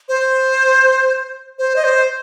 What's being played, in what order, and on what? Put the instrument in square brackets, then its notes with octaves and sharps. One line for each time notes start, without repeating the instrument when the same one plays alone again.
[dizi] C5
C5
D#5
C5